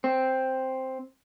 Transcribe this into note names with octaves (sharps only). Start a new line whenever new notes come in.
C4